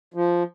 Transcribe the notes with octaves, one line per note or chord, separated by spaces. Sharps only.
F3